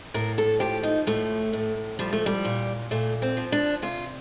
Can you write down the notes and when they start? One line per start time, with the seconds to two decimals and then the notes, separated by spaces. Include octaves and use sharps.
0.14 A2 A#4
0.38 A4
0.60 F3 G4
0.83 D#4
1.07 A2 A3
1.53 A2
1.99 F3 G3
2.13 A3
2.26 G3
2.45 A#2
2.91 A#2 A3
3.22 C4
3.37 F3
3.52 D4
3.82 C3 F4